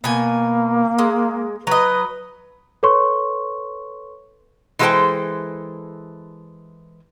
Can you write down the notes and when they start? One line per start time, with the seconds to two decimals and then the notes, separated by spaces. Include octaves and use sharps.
0.04 B2 A#3 G#5
0.98 G#3
1.67 F#3 B4 D#5
2.83 A4 B4 C#5 C6 C#6
4.79 E3 G#3 F4 A4 C5 G5